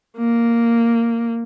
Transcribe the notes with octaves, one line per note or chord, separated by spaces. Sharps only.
A#3